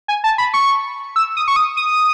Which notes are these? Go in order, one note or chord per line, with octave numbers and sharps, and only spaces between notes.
G#5
A5
B5
C#6
E6
D#6
C#6
D#6
D#6